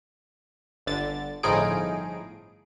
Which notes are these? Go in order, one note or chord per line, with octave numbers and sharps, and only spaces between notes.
G1 D3 A6
G1 A2 F3 D#4 G#4 D7